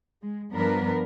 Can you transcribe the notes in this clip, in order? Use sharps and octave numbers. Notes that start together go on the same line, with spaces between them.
G#3
G2 F3 B3 D4 A#4 B4